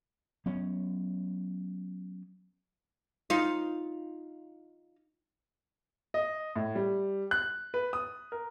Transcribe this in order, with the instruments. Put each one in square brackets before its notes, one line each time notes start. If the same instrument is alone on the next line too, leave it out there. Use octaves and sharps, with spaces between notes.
[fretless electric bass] F#3 B3 C#4
[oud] D#4 F4
[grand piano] D#5
A2
G3
F#6
B4
D#6
A#4